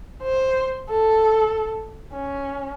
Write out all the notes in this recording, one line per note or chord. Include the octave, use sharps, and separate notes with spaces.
C5
A4
C#4